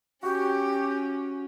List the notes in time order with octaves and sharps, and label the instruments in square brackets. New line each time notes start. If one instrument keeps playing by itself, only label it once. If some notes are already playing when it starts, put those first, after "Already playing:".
[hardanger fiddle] C#4 [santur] F#4 [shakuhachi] G4